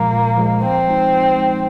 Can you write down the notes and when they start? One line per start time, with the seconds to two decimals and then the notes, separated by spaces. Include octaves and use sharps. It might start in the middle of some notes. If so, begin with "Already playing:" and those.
Already playing: A#2 F3 G#3 A#3
0.12 A#2
0.37 F3 G#3
0.62 F3 C4
0.87 G#3 D#4
1.13 F3
1.37 G#3 D#4